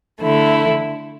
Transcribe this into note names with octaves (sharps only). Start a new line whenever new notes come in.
D3 A3 E4